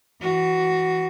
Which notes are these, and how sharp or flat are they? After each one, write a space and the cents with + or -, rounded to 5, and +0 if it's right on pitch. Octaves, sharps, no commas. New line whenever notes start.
E3 +0 F#4 +10